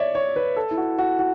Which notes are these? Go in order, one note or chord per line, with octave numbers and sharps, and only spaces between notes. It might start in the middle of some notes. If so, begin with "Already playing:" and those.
Already playing: C#5 D5 E5
C#5
B4
A4
E4
F#4
F#4
F#4